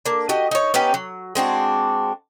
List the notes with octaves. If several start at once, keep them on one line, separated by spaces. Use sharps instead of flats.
A#3 D4
F#4 G4 D#5
D#4 C#5
B3 C#4 D#4 G4
F#3
G#3 C4 D4 F#4